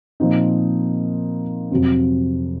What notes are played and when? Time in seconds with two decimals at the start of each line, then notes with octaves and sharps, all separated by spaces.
0.20 A#2 F3 C4 D#4
1.71 F2 C3 F#3 C4